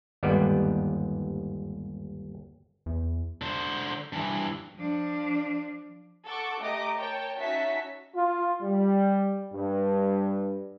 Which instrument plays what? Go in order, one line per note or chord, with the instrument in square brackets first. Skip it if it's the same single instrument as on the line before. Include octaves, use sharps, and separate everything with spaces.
[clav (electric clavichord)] G1 D#2 G#2 G3 B3 D5
[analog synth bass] E2
[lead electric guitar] D3 C5
G2 E3
[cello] F3 D4
[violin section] A4 F#5 A5 C#6 D6
A3 G4 D#5 A#5 D6
A#4 C#5 G5 A5
C#4 D#4 F#4 E5 A5 B6
[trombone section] F4
G3
G2